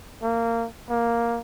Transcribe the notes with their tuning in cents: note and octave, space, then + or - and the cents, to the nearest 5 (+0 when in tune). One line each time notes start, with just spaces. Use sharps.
A#3 -20
A#3 +5